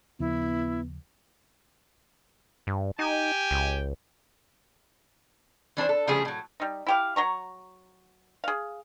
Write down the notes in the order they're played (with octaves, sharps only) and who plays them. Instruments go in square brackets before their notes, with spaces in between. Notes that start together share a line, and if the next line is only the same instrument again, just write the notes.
[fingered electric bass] D#2 C#3 F3 [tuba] B3 [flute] E4
[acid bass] G2
[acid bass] D#4 [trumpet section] G4 G5 G#5
[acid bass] C#2
[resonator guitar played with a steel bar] E3 D4 A#4 C5
A4
C#3 F3 G3 A3 G#4
A2 F#3
[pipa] G3 D#4
E4 G4 F5
F#3 A#5 C#6
G#4 F5